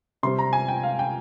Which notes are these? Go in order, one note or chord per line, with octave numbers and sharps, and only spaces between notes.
C3 G3 C4 C6
A#5
G#5
G5
F5
G5